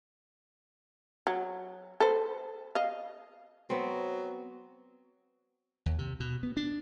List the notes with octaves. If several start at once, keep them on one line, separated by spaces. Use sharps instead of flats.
F#3
A4 B4 C5
D#5 F5
F#3 B3 C4
D#2
C3
B2
B3
D4